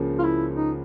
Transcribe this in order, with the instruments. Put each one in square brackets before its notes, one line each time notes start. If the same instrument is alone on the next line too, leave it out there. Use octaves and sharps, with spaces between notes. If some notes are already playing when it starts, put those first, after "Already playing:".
Already playing: [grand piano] C#2 C#3 F3 A#3
[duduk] F4
E4
D#4